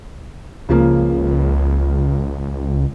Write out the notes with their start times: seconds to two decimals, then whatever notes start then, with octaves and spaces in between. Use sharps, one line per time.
0.69 C#2 C#3 F3 A#3